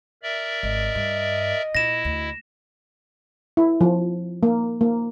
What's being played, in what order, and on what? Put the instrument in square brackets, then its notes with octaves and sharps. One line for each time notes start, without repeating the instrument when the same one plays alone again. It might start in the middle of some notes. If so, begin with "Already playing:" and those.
[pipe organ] A#4 D5 E5
[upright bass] G#1 [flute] D#5
[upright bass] G2
[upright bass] A#2 [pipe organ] E4 [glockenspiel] A#6 E7
[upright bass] D2
[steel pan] E4
F3
A#3
A#3